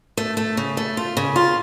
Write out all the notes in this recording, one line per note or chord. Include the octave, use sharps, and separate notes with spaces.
A3
A3
C#3
A3
F4
C#3
F4